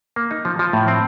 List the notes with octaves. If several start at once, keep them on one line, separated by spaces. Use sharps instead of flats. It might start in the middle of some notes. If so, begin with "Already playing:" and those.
A#3
D#4
F3
F3
A2
C4